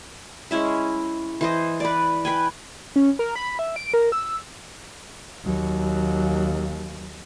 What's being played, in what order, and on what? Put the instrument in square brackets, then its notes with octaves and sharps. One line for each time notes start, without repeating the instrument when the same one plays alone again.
[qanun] G#3 C#4 E4 E5
E3 C5 D#5
B4 D5
B4 G5 G#5
[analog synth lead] C#4
A#4
B5
E5
D7
A#4
E6
[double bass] D#2 F#3